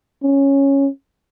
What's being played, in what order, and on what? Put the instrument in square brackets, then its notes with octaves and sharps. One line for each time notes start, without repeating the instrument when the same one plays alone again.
[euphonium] C#4